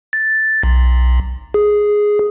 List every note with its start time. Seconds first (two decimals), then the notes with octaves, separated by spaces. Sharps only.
0.13 A6
0.63 B1
1.54 G#4